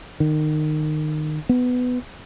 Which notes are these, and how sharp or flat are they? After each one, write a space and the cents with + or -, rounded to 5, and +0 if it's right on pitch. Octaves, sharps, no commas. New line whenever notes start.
D#3 -25
B3 +15